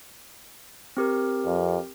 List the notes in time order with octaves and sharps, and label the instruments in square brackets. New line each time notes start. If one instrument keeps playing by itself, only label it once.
[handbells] C4 G4 A#4
[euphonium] F2